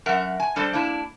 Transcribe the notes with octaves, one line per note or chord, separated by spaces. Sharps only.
F#2 A#4 E5 F#5
G#5
G3 D4 A4 C5 D5
A#3 D4 E4